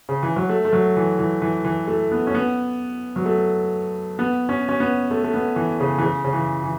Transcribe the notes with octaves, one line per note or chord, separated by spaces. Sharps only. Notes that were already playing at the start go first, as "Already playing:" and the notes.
C#3
E3
F#3
A3
A3
F#3
E3
E3
E3
E3
A3
B3
C#4
B3
F#3
A3
B3
C#4
C#4
B3
A3
A3
B3
E3
C#3
E3
C#3
C#3
E3
E3